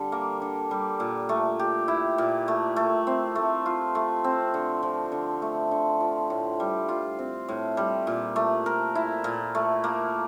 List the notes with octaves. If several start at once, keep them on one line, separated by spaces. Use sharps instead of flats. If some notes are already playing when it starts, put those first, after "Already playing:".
Already playing: D3 G3
A#3
D3
G3
A#2
A3
G4
E4
A#2
A3
A3
C4
A3
F4
A3
C4
D3
F3
D3
A3
D3
F3
A2
G3
F4
C4
A2
G3
A#2
A3
A#4
E4
A#2
A3
A#3